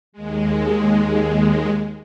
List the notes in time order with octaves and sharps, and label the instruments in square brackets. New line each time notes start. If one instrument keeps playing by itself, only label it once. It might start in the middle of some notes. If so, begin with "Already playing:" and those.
[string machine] D#2 G#3